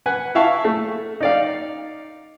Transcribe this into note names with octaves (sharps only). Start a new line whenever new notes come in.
B4 F#5 G#5
E4 E5 F5 A5 C#6
A3
D#4 D5 F5